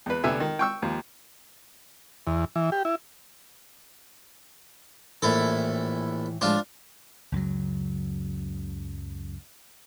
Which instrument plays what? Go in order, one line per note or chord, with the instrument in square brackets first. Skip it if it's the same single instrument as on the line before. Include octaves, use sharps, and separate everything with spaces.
[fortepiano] E2 B4
C2 D3 A3 B3 E5 G#5
D#3
G5 C#6 E6
D#2 F3
[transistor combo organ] E2
E3
G4
E4
[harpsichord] A#1 E4 A4 [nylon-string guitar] A2 E3
[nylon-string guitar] A2 F3 G#3 [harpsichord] D4 F4
[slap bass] C#2 F#2 C#3 F#3